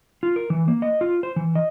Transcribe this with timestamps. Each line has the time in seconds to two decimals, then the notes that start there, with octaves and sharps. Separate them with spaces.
0.23 F4
0.36 A#4
0.50 E3
0.68 A#3
0.82 D#5
1.01 F4
1.23 C5
1.36 E3
1.55 D#5